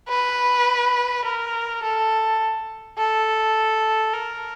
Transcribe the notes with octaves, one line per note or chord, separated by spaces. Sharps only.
B4
A#4
A4
A4
A#4